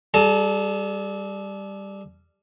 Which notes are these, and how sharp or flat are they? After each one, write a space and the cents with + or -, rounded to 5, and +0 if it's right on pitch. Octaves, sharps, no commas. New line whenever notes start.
G3 +10 A4 -40 A5 +40